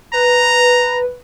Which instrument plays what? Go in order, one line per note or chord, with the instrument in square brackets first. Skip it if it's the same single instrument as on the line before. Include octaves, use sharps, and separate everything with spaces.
[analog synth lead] B4 [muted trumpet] A#5